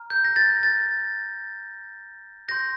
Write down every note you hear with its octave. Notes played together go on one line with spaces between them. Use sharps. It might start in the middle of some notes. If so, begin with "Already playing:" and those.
Already playing: A#5 F6
G6
A#6
A6
A6
C6 G6 A#6